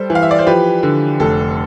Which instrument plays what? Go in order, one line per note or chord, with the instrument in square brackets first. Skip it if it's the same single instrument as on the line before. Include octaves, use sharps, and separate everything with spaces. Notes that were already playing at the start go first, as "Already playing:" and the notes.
Already playing: [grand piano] G3 A4 C5
E3
F5
E5
D5
C5
F3 G4 B4
D3
F1 A4